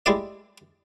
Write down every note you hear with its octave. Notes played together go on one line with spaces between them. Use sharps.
G#3 E4 G4 D5 D#5